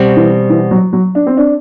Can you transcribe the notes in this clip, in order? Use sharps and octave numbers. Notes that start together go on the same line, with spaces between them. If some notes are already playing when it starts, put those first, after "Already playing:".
Already playing: B2 G3 C4 F#4
E3
E3
F#3
F#3
D4
C4
D4